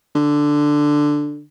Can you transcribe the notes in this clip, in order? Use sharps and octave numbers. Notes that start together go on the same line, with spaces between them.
D3